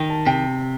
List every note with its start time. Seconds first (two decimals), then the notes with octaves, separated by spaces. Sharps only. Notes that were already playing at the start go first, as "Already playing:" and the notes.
Already playing: D#3 G5
0.10 A5
0.26 C3 G5